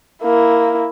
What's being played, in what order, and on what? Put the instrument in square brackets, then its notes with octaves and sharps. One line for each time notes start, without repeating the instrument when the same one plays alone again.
[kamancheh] A#3 E4